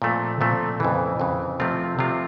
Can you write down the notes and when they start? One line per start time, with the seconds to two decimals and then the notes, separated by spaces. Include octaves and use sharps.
0.02 A#2 F3 A3 C4
0.41 A#2 F3 A3 C4
0.80 F2 C#3 E3
1.20 F2 C#3 E3
1.60 C3 F3 A3 C4 F4
1.99 C3 F3 A3 C4 F4